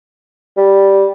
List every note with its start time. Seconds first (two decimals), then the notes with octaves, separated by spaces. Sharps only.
0.57 G3